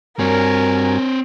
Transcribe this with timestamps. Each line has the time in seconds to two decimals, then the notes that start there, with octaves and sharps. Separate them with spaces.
0.19 G2 C4 F#4 A#4 C#5 G#5